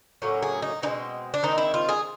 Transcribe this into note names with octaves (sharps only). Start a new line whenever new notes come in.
A2 F#3 A#3 C#4
G#4
D#4
B2 G#3 C4 D#4
D4
D#3 G#3 C4 D#4
E4
F4
G#4